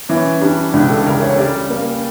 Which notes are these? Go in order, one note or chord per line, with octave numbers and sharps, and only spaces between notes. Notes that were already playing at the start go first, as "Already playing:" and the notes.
E3 C#4
G3 D4
C#2 D4
A4
C#3 A#4
C#5
G3 D5
A#3